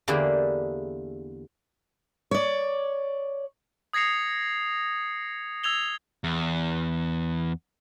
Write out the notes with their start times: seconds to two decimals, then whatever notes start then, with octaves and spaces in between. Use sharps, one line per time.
0.08 E2 D3 A#3 E4 G4 G#4
2.31 C#5 D5
3.93 D#6 G#6 A#6 C7 C#7 F7
5.64 E6 G#6 F7 G7
6.24 E2